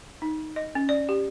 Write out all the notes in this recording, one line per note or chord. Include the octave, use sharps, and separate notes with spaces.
D#4
D#5
C#4
D5
G4